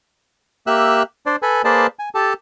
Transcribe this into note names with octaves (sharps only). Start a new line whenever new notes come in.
A#3 G4 E5 E6 F#6
D4 C5 D5
A4 B4 G#5
A#3 G#4 B4 C5 D5 A5
G#5
G4 A4 A5